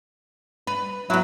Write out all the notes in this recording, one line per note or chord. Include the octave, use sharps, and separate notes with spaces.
B4
F#3 B3 E4